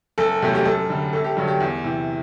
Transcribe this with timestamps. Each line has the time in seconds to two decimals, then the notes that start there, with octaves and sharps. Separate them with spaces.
0.18 F#1 A4
0.42 E2 C3 F#3 A3
0.55 G4
0.65 F#2 A4
0.89 D3 G3
1.13 G1 A4
1.24 G4
1.37 G2 D3 F#3
1.48 G4
1.60 E2
1.84 C3 E3